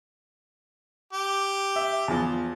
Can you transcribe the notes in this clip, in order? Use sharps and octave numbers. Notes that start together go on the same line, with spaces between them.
G4
E5
E2 F3